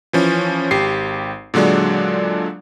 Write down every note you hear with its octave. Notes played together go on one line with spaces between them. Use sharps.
E3 F3 C#4
G#1 G4 C7
A#2 D3 F#3 G#3 D4